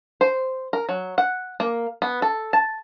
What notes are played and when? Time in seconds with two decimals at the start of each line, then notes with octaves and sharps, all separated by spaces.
0.21 C5
0.73 A#4
0.89 F#3
1.18 F#5
1.60 A#3
2.02 B3
2.22 A4
2.53 A5